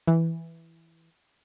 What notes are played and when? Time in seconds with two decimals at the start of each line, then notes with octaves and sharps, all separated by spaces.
0.07 E3